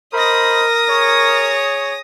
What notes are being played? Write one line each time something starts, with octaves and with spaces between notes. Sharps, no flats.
A#4 C5 D#5 B5 D#6 A#6
G#4 C#5